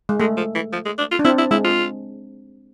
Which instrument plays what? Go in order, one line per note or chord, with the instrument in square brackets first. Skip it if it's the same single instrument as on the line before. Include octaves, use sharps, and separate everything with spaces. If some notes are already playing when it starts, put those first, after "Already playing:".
[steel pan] G#3
[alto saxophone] G#3 [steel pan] A3
[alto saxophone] F3
E3
F3
G#3
D4
F4
[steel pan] D4
[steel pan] C4 [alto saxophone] E4
[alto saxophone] E4
[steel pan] G#3 [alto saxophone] E4
[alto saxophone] F4